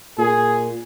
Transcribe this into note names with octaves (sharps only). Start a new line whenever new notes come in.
A#2 G#4